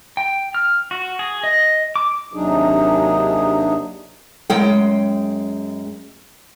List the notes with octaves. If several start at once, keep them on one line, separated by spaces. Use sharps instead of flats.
G5
F6
F#4
G#4
D#5
D6
D#2 C3 F#3 D4 D#4 G#4
F#2 G#3 G5